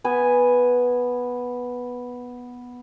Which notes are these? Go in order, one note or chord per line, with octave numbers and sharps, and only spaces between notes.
B3 G#5